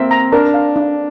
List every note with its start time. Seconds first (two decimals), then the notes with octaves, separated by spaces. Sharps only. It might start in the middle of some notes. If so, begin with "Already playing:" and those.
Already playing: A#3 C4 E5
0.11 A#5
0.32 D4 A#4
0.54 F5
0.76 D4